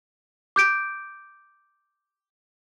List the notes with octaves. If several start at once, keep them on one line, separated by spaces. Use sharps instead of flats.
D6 G6 D7